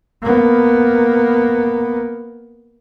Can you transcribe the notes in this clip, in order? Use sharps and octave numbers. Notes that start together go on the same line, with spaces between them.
A#3 B3